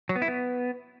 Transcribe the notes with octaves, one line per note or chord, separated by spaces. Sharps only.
F#3
B3
E4
B3